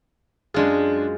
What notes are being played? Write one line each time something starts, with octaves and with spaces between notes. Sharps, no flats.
F#2 G#3 D4 F4 G#4